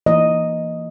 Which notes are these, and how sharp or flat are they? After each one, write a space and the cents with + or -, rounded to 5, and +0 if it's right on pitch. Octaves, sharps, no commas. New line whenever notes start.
E3 +20 A#3 +0 D#5 +0